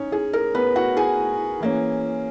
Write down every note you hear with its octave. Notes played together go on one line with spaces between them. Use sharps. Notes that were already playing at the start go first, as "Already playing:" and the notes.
Already playing: C#4 D#4 C#5
G#4
A#4
B3 B4
F#4 F#5
G#4 G#5
E3 A#3 C#4